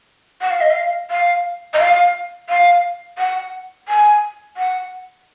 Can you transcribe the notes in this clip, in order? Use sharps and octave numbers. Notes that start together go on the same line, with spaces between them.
F#5
F5
D#5
F5
F5
D#5
F5
F5
F#5
G#5
F#5